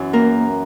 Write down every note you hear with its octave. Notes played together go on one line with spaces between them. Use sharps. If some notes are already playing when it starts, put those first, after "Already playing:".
Already playing: F#2 E3
A#3 A#4